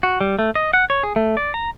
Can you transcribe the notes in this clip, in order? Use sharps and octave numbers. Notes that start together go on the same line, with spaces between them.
F#4
G3
A3
D#5
F#5
C#5
G#4
A3
D5
A#5